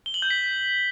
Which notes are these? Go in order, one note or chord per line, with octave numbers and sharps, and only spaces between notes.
G7
F#7
G6
B6